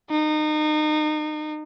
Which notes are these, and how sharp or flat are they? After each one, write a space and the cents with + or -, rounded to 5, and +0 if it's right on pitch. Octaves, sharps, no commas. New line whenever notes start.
D#4 -30